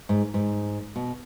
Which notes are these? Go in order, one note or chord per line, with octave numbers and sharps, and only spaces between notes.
G#2
G#2
B2